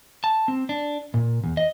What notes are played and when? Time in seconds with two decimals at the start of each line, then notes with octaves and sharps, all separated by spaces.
0.24 A5
0.48 C4
0.69 D4
1.14 A#2
1.44 E2
1.57 D#5